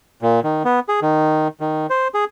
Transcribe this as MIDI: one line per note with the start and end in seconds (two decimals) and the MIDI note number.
0.22 0.40 46
0.44 0.63 51
0.65 0.80 59
0.89 1.00 68
1.02 1.48 51
1.60 1.87 51
1.90 2.08 72
2.14 2.25 68